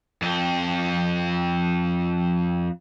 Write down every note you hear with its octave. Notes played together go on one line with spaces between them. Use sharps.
F2 C4